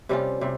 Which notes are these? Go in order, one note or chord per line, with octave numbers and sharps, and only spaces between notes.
C3 G3 C#4 F4
C3 G3